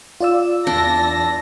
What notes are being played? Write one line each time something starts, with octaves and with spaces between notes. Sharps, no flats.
F4 D5 E6
E2 D4 A5 A#6